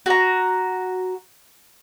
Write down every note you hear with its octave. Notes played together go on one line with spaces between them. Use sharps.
F#4 A#5